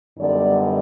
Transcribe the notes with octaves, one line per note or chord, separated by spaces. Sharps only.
F#2 D3 G3 B3 D#4 D5